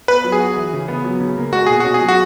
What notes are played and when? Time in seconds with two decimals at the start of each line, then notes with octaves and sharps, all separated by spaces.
0.08 B3 B4
0.24 F#3
0.32 G#4
0.40 F#4
0.56 E3
0.73 C#3
0.88 B3
1.04 F#3
1.20 C#3
1.37 A#3
1.53 G#3 F#4
1.66 B2 G#4
1.80 C#4 F#4
1.94 G#4
2.01 F#3
2.08 F#4